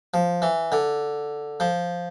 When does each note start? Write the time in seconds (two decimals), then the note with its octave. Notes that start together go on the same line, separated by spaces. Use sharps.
0.14 F3
0.42 E3
0.72 D3
1.60 F3